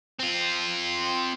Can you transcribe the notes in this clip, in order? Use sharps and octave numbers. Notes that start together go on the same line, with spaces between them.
C4 F4